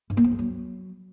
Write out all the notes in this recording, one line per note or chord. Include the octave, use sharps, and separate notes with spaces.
G2
A#3
F3
G#3
F#3